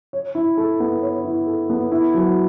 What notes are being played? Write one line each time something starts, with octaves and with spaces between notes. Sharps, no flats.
C#5
E4
A4
B3
C#5
E4
A4
B3
E4
F#3